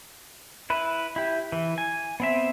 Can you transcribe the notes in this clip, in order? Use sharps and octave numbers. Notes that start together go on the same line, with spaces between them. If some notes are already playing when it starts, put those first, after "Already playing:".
E4 B4
E4 G4
E3
G#5
B3 C4 E5